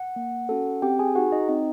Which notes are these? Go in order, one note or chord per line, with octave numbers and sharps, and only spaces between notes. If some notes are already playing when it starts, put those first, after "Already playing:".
Already playing: F#5
A#3
C#4 F#4 A4
C4 G4 G5
G#4 G#5
D#4 F#4 G#4 F#5
D#4 D#5
C4 D#4 D#5